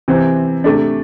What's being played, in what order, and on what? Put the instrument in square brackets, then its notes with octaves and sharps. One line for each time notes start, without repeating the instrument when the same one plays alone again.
[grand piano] C3 E3 C4
C3 A3 D4